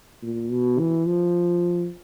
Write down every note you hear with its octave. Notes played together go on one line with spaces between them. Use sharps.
A#2
B2
E3
F3